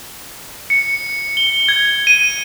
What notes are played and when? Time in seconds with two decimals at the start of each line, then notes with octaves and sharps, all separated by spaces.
0.70 C#7
1.37 G7
1.68 G#6
2.07 D#7